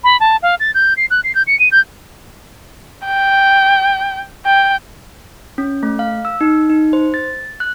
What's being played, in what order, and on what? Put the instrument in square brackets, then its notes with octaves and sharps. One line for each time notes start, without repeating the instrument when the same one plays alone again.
[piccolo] B5
A5
F5
A6
G6
C7
F#6
C7
G6
C#7
D#7
G6
[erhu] G5
G5
[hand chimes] C#4
A3
F5
E6
D#4
D#4
C5
A6
F#6